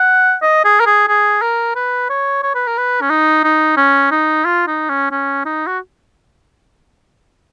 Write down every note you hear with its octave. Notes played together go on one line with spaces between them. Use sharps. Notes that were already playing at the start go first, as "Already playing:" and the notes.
Already playing: F#5
D#5
G#4
A#4
G#4
G#4
A#4
B4
C#5
C#5
B4
A#4
B4
C#4
D#4
D#4
C#4
D#4
F4
D#4
C#4
C#4
D#4
F#4